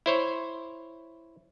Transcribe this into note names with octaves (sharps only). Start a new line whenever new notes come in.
E4 C5 C#5